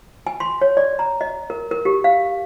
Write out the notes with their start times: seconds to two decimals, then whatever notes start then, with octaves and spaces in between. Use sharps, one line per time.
0.27 G#5
0.40 C6
0.61 C#5
0.77 D5
0.99 A#5
1.21 D#5
1.50 A#4
1.71 A#4
1.85 G4
2.04 F5